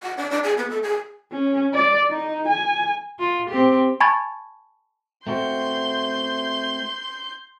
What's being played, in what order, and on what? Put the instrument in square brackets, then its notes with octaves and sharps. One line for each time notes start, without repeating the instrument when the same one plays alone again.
[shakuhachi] F#5
D4
D4
G#4
B3
A4
G#4
[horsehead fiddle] C#4
D5
D#4
G#5
[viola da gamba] F4
C4 G4
[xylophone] G#5 A5 B5 C#6 G#6 A6
[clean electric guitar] A3 C4 F#4 [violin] C6 G6